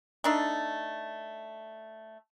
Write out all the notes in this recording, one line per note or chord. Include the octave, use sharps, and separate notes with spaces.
A3 D4 D#4